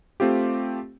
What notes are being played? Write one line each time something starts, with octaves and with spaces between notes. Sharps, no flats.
A3 C4 F4 G4